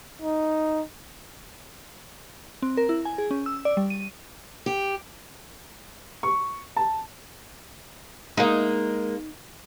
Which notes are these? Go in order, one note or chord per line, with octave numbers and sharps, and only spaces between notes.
D#4
C4
A#4
E4
G#5
G#4
C#4
E6
D5
G3
D#7
G4
C#6
A5
G#3 A#3 D#4